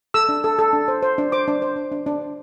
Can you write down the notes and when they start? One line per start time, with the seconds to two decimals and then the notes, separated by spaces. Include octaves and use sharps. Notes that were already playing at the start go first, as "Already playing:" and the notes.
0.14 A4 E6
0.29 D4
0.44 A4
0.59 A4
0.73 D4
0.88 C5
1.03 C5
1.18 D4
1.32 C5 D6
1.48 D4
1.62 C5
1.76 D4
1.92 D4
2.06 D4
2.21 C5